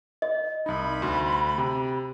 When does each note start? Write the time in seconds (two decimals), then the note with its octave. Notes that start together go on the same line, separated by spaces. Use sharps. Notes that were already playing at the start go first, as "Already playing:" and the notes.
0.22 D#5
0.66 C2 D#4 B5
1.02 D2 F#4 C6
1.58 C3